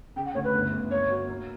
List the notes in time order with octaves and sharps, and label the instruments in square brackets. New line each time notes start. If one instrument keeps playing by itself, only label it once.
[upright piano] C#3 [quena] G5
[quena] F#5
[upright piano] D2 [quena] C#5
[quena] B4
[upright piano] G1
G1
[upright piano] A#3 [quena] C#5
[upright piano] F#4
A#3